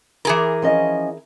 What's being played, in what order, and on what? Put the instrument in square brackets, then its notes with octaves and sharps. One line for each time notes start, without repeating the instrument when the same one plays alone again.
[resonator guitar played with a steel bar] E3 G#4 A#4
[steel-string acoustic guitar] F3 C#4 D#5